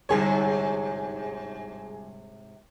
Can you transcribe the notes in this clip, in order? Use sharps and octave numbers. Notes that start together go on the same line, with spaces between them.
G1 G#2 C3 G#4 C#5